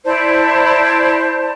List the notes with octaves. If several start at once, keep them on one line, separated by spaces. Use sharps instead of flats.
E4 C5 D5 A5